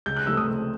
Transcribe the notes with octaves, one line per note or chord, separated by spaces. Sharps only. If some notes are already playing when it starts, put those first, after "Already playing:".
C#2 G6
F#6
C3 F3 A3 E6
D#6
C#2